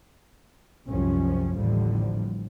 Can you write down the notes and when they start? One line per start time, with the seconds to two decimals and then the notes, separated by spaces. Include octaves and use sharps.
0.86 C2 F#2 C3 F3 C#4
1.56 A1 D#2 A2 D3 F3 G3